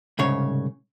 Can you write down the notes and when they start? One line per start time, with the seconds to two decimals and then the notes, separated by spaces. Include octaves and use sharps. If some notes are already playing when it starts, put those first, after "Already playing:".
0.19 C2 G#2 C#3 C#5